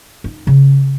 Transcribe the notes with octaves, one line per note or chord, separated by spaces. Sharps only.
D#4
C#3